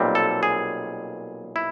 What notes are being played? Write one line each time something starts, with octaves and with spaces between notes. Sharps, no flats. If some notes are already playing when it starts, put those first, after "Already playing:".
Already playing: B1 A#2 G3 C4
A4
G#4
E4